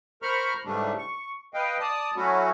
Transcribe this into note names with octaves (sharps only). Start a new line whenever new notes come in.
A#4 C5 A#5 B5 C#6 F6
G#2 C#3 E3 G3 A3 D4
C#6
B4 D#5 F5 G5
D5 A5 D#6
F#3 A3 C#4 E4 F#4